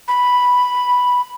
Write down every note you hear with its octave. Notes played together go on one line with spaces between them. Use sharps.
B5